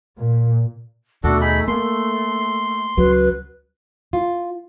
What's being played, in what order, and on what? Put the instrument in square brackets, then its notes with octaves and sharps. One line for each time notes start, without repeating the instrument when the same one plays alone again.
[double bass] A#2
[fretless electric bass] D#2 B2 [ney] A3 [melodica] D4 F#4 A4
[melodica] D#4 G#4 B5
[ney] A3 [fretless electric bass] A#3 [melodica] C6
[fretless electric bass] C#2 C#3 F#3 [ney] B4
[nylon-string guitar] F4